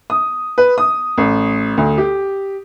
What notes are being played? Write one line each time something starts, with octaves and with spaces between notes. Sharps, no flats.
D#6
B4
D#6
A1
D2
G4